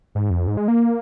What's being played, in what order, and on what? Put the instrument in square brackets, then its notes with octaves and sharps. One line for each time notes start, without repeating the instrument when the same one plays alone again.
[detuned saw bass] G#2
F2
G#2
G#3
A#3